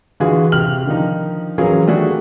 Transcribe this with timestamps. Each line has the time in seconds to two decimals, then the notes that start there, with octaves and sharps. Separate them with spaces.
0.20 D3 E3 F4 F#4 G#4
0.52 C3 G4 F6 F#7
0.86 D3 D#3 F3 D#4
1.58 E3 F#3 C#4 F4 G#4 A#4
1.86 D#3 G3 A3 D4 F#4 G#4